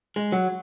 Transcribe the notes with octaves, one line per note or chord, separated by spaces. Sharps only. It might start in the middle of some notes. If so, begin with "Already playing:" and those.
G#3
F#3